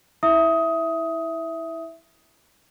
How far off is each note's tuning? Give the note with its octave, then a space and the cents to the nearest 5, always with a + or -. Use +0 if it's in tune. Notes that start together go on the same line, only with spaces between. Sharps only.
E4 -25 E5 +0 D#6 +15